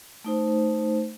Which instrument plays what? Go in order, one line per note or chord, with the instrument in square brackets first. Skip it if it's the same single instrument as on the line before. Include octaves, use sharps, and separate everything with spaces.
[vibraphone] A3 D#4 C5